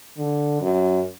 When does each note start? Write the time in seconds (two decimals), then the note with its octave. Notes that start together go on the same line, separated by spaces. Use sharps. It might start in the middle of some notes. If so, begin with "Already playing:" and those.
0.18 D3
0.61 F#2